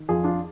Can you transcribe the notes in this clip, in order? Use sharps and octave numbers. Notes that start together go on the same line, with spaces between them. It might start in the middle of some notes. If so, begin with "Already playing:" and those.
Already playing: D#3
F2 F4 G#4
D4 F4